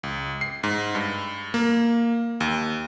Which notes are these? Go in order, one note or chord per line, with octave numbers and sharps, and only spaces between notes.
C#2
C7
G#2
G2
A#3
D#2